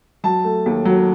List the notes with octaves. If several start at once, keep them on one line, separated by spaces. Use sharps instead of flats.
F#3 A5
A3
D#2
F#3